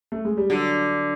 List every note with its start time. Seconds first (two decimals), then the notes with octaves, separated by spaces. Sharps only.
0.12 A3
0.25 G#3
0.37 G3
0.50 D3 F#3